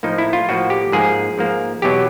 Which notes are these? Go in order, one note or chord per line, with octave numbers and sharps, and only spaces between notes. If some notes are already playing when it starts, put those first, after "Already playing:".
A2 F3 A#3 D#4
E4
F4
A2 F3 A#3 F#4
G4
G#2 F3 A#3 G#4
G#2 F3 A#3
E2 B2 F#3 G4